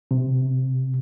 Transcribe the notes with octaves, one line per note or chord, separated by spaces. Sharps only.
C3